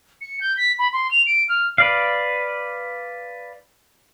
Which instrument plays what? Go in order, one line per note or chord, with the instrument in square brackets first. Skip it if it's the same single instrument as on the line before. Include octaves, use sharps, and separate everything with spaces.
[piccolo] C#7
G6
B6
B5
C6
F7
D7
F6
[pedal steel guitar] B4 D5 F5